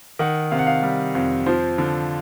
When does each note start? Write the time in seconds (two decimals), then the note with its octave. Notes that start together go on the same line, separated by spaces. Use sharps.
0.19 D#3 F#5
0.51 C3 F5
0.59 F#5
0.67 F5
0.83 G3
1.15 F2
1.46 F3 C5
1.78 D3